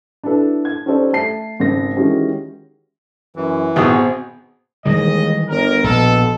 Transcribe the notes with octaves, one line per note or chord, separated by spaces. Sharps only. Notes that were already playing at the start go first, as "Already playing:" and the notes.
D4 E4 F#4 A4 B4
G#6
C#4 D#4 G4 A4 C5 D5
A3 A5 C7
G#1 C#3 C4 A#6
D#3 E3 G#3 C#4 F#4 G4
F#2 E3
G#1 B2 B3 C4 F#4 G#4
D#2 D#3 E3 G3 G#3 D#5
G1 A#4
A#1 B2 A4